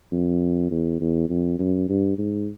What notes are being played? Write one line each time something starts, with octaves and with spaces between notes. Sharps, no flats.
F2
E2
E2
F2
F#2
G2
G#2